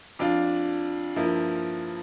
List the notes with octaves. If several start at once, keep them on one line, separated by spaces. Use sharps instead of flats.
F2 D4 F4
G2 F3 A#3 E4